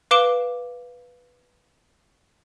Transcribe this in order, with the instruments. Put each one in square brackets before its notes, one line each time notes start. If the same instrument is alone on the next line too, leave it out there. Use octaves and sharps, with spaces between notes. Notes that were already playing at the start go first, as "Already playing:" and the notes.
[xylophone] B4 F5 D6 D7 E7 G7